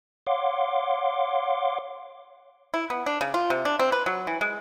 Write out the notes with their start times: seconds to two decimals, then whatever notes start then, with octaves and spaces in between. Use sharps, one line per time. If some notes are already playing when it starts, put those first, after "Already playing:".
0.27 C#5 F5 F#5 C6 D6
2.74 E4
2.90 B3
3.06 D4
3.21 C#3
3.34 F4
3.50 C3
3.65 D4
3.79 C4
3.92 B4
4.06 F#3
4.27 E3
4.41 G#3